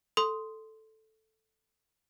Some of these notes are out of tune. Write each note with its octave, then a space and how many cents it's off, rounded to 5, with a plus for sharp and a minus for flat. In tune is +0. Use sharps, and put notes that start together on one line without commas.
A4 +0 C6 -5 D#6 +5